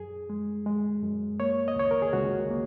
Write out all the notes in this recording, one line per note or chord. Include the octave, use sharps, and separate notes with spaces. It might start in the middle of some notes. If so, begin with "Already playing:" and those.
Already playing: F#2 G#4
G#3
G#3
F#2
A#3 C#5
D#5
C#2 C#5
A#4
G#4
C#2 F#4
A#3